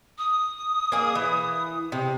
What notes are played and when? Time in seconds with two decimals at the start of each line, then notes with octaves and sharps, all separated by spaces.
0.18 D#6
0.92 A#3 G#4
1.15 E3
1.92 C3